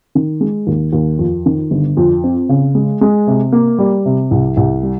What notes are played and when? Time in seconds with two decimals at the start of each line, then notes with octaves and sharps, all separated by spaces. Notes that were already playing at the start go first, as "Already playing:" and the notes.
0.15 D#3
0.41 G#3
0.67 D#2
0.93 D#2
1.19 F2
1.46 D#3
1.71 G1
1.97 F2
2.24 C4
2.49 C#3
2.75 G#3
3.01 G#3
3.27 C3
3.52 A#3
3.79 G3
4.06 C3
4.31 C2
4.57 C2
4.83 G3